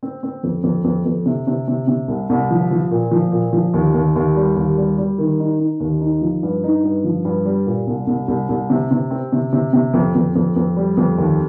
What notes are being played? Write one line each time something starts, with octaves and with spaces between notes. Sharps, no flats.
C4
C4
F2
F2
F2
F2
C3
C3
C3
C3
C2
C2
F3
F3
A#2
F3
A#2
F3
D#2
D#2
D#2
G3
D#2
G3
G3
D#3
D#4
D#4
D#2
D#4
F3
G2
D#4
G2
F3
G2
G3
A#2
C2
C2
C2
C2
C3
C3
C4
C3
C3
C3
F2
F2
F2
F2
G3
F2
D#2